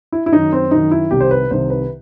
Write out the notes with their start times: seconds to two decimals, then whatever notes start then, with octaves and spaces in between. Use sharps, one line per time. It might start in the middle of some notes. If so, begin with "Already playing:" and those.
0.12 E4
0.26 E4
0.32 F#2 D#3 D#4
0.52 C4
0.71 F#2 D#3 D#4
0.91 E4
1.11 C2 C3 D#3 G4
1.20 C5
1.31 B4
1.51 C2 C3 D#3 C5
1.70 B4